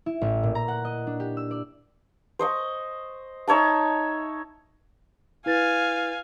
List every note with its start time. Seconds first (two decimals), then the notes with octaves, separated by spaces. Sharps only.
0.06 E4
0.21 A1
0.43 A#2
0.55 A#5
0.68 F#5
0.85 D#5
1.07 D4
1.20 G4
1.37 E6
1.51 D5
2.39 C5 D#5 C#6
3.48 D#4 C#5 E5 A5
5.46 E4 B4 F5 G#5 A6